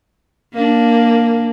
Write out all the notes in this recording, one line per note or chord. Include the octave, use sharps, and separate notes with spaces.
A#3 D4